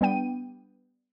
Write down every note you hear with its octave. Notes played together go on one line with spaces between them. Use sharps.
G3 B3 D4 G5 D#7